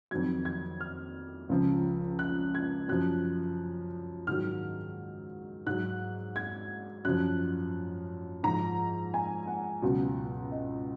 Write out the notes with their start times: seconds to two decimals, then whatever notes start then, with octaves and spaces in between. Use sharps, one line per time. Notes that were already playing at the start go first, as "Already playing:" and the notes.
0.11 F2 D#3 F#3 G#6
0.45 G#6
0.81 F6
1.49 C#2 C#3 F3
2.19 F#6
2.55 G#6
2.88 F#2 F3 F#6
4.27 G#2 D#3 F#3 F6
5.66 G#2 F#3 F#6
6.36 G#6
7.05 F#2 F3 F#6
8.43 G#2 F3 A#5
9.14 G#5
9.47 F#5
9.82 C#2 B2 F#3
10.51 D#5